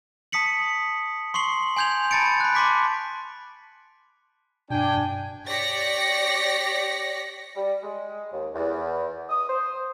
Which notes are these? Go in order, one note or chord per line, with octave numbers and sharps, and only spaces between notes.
A5 D#6 B6 C#7 F#7
C6 C#6 C7 F#7
G#5 C6 G6 G#6 F7
A5 B5 A6 C#7 D7
B5 F#6
A5 C6 D6 B6
G2 B2 D4 G5 G#5
G4 C#5 D5 A#6 B6 C#7
G3
G#3
D#2
E2
D#6
C5